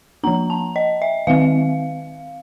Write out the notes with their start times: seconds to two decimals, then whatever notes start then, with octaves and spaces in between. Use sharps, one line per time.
0.24 F3 A#3 D4 A#5
0.50 A5
0.76 D#5
1.02 E5
1.27 D#3 G#3 C4 F5